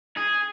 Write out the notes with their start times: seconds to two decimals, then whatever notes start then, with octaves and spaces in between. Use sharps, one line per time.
0.17 G#4